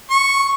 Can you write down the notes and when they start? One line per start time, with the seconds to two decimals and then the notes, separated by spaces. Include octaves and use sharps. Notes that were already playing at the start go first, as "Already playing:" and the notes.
0.11 C#6